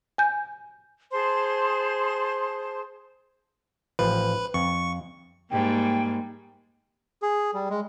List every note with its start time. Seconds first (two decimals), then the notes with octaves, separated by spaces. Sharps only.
0.18 G#5 G6
1.12 G#4 C5 A5 C6
3.99 A1 F3 B4
4.54 F2 C#6
5.50 G#2 G3 A#3 G5
7.22 G#4
7.54 G3
7.69 G#3